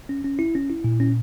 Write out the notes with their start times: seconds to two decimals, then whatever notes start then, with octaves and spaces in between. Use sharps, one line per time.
0.09 C#4
0.24 C#4
0.39 E4
0.55 C#4
0.70 E4
0.84 A#2
1.00 C#4